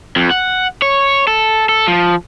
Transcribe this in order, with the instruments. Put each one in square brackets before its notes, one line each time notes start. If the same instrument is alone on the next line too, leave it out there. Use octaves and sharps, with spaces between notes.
[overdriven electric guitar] F2
F#5
C#5
A4
A4
F3